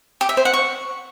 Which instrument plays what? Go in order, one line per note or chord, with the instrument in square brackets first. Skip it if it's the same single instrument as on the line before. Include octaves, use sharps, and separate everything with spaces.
[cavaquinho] G4
E5
C5
F#5
C#6